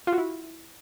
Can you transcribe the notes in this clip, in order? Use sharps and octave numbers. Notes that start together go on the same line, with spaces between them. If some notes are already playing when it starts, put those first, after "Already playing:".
F4
F#4
E4